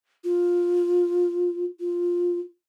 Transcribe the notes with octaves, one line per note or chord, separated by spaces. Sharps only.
F4
F4